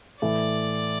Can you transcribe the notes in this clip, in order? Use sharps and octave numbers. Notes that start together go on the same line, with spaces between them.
A2 E3 A3 D5